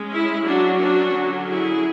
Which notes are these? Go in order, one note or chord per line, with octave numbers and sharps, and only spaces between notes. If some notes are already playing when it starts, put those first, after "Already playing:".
Already playing: G#3 C#4
E4
F#3 C#4 D4 F#4
D4 F#4
D3 F#3 C#4
E4 G#4